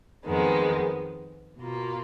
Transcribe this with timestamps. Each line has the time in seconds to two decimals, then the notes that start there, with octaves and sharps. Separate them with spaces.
0.24 F2 D#3 G#3 B3
1.58 B2 A#3 F4